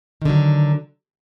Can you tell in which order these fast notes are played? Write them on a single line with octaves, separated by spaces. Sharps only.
D#3 D3 F#3